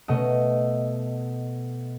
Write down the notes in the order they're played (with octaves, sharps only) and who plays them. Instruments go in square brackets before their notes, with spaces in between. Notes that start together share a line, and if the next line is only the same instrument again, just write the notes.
[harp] B2 A3 D#5